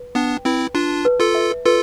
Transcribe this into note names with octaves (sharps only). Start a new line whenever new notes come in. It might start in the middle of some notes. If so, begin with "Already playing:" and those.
Already playing: B4
B3 D4 G5
C4 E4 B4
D4 F4 A5
B4
F4 A4
E5
F4 A4 B4